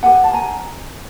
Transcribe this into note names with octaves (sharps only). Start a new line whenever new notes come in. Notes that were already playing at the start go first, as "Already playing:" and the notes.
E4 G4 B4 F#5 G#5
A5
G#5 A#5